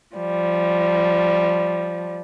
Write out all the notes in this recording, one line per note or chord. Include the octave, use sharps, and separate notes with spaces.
F3 G3